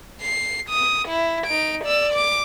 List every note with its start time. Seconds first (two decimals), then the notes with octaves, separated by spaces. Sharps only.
0.21 C7
0.69 D#6
1.08 E4
1.46 D#4 D7
1.84 D5 E6
2.13 D6